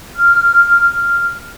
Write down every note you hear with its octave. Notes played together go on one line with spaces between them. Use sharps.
F6